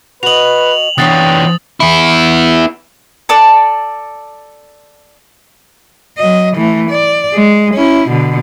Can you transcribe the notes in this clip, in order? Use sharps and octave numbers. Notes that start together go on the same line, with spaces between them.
F#4 B4 D#5 F7 F#7
E3 B3 D4 F4 C#5 G5 D#6 A6
B3 E4
A4 D5 A5 D6
F#3 D#5
E3 A3
D5
G#3
C#4 E4
B2 D3